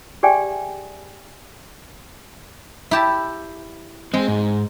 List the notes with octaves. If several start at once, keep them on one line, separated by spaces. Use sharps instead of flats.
G4 G#4 D5 E5 G5 G#5
E4 G4 A5
G#3 C4
G#2